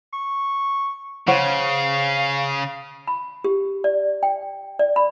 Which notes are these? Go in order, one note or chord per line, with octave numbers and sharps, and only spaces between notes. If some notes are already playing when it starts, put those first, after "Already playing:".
C#6
C#3 C5 C#5 F5 F#5
B5
G4
D5
G5
D5
B5